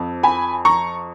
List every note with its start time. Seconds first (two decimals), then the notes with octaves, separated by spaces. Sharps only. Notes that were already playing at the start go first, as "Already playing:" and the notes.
Already playing: F2 F3
0.23 G#5 B5
0.65 A#5 C#6